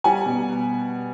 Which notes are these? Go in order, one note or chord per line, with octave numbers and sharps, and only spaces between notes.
G3 F#5 G#5
B2